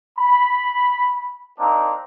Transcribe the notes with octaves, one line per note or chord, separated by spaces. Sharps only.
B5
A#3 C4 D4 D#4 A#5